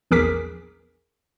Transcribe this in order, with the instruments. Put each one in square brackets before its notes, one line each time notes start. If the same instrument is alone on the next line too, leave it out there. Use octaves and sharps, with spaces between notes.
[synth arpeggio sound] A#1 E2 G#4 A#4 D6 B6